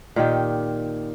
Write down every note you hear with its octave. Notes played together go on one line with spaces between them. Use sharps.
A#2 D#3 G4